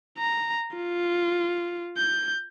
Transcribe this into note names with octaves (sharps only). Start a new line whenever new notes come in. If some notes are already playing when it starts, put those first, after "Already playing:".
A#5
F4
G6